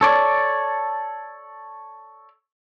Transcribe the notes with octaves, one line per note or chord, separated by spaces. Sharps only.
A4 C#5 D5